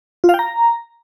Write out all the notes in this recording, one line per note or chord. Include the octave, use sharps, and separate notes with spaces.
F4
F5
G5
A#5